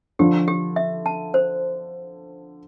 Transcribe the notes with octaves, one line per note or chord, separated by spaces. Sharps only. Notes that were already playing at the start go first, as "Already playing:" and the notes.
D3 F3 G4
G4
E5
A5
C5